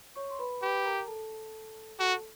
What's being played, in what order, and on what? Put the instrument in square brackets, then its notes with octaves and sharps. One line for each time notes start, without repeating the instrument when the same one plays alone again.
[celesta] C#5 C#6
C6
B4 B5
[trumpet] G4 [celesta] B4 B5
[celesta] A#4 A#5
A4 A5
[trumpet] F#4 [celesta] A4 A5